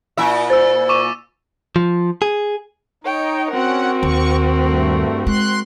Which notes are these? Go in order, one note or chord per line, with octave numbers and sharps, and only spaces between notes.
A#2 E4 E5
C5 E6 A6
C#6 D6 D#7
F3
G#4
D#4 C#5 G5
C4 C#4 F#4 A#4 F#5
D#2 C#6
G2 A3
G#3 C6 F#6